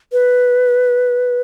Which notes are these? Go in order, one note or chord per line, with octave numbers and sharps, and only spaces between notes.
B4